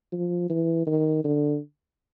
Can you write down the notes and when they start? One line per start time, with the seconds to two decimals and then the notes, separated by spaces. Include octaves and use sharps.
0.12 F3
0.49 E3
0.86 D#3
1.24 D3